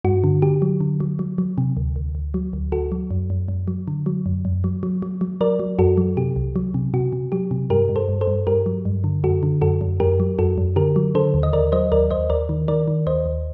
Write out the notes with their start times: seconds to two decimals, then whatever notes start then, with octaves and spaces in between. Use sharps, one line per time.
0.04 G2 F#4
0.24 D3
0.42 D3 G4
0.62 F#3
0.81 D3
1.00 F#3
1.19 F#3
1.38 F#3
1.58 C3
1.77 D2
1.96 D2
2.15 D2
2.34 F#3
2.53 D2
2.72 D2 F#4 A4
2.92 F#3
3.11 F#2
3.30 F#2
3.48 F#2
3.68 F#3
3.88 D3
4.06 F#3
4.26 F#2
4.45 F#2
4.64 F#3
4.83 F#3
5.02 F#3
5.21 F#3
5.41 F#3 A#4 D5
5.59 F#3
5.79 F#2 F#4 A4
5.98 F#3
6.17 C3 G4
6.36 C2
6.56 F#3
6.74 C3
6.94 C3 F#4
7.13 C3
7.32 F#3 G4
7.51 C3
7.70 G2 G4 A#4
7.89 G2
7.96 A4 C5
8.09 G2
8.21 A4 C5
8.27 G2
8.47 G2 G4 A#4
8.66 F#3
8.85 G2
9.04 D3
9.24 F#2 F#4 A4
9.43 D3
9.61 F#2 F#4 A4
9.81 F#2
10.00 F#2 G4 A#4
10.20 F#3
10.39 F#2 F#4 A4
10.58 F#2
10.76 D3 G4 A#4
10.96 F#3
11.15 D3 A4 C5
11.34 D#2
11.43 D#5
11.53 D#2 A#4 D5
11.72 F#3 C5 D#5
11.92 D#2 A#4 D5
12.11 D#2 C5 D#5
12.30 D#2 A#4 D5
12.49 D#3
12.68 D#3 A#4 D5
12.88 D#3
13.06 D#2 C5 D#5
13.26 D#2